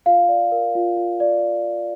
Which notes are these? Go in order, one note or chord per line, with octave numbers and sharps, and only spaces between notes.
F4 F5
D5
A#4
F4
F4
D5